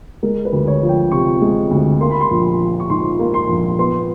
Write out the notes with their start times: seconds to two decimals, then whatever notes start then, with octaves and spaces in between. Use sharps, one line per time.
0.23 G#3 A#4
0.45 B4
0.53 D2
0.67 C#5
0.82 F3
0.89 G5
1.12 C3 C#6
1.41 G#3
1.71 D2
2.00 A#3 C6
2.11 B5
2.21 C6
2.31 A#1
2.60 F3
2.80 C#6
2.90 G#2 C6
3.19 A#3
3.34 C6
3.49 A#1
3.79 B3 C6